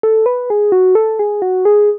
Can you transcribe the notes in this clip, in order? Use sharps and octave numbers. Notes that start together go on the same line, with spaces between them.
A4
B4
G#4
F#4
A4
G#4
F#4
G#4